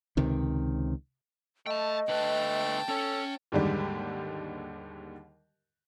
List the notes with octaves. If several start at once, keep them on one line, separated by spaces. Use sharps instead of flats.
C#2 C3 D#3
A3 D#5 G5 A5
D3 A3 B4 G5 A5
C#4 A4 C#5
D#2 G#2 D3 G3